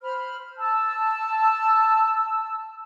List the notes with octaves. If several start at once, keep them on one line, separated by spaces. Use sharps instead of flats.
C5 B5 F6
A5 E6